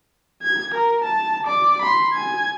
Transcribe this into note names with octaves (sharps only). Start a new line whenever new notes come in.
G#6
A#4
A5
D5 D6
B5 C6
G#5 G#6